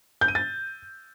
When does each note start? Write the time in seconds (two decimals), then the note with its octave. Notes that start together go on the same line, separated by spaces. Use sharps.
0.21 G6
0.28 D#7
0.35 A6